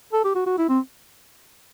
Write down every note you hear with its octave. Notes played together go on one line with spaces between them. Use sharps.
A4
G4
F#4
F#4
E4
C4